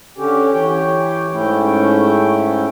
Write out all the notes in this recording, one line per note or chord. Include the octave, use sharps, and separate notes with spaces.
D3 C#4 G4
E3 G4 C#5 G5
G#2 A3 C#4 E4 G5